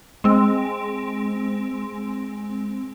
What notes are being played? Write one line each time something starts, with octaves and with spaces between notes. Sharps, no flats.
G#3 C4